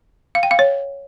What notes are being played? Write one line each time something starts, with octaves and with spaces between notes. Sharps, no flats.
F5
G5
F5
C#5